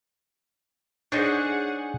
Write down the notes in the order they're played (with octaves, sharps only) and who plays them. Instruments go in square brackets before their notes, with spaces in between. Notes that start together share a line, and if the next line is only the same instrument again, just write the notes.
[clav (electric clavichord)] D4 D#4 C5 [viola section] G#4 F#5 [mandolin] C#5 G#5 G6